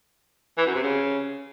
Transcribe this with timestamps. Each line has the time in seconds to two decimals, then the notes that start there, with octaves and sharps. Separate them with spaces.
0.58 E3
0.66 F#2
0.75 C3
0.83 C#3